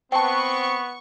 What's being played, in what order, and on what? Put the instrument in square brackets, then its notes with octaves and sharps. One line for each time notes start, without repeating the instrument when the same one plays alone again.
[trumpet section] B3 [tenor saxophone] C4 [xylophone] G5 A5 [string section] C#6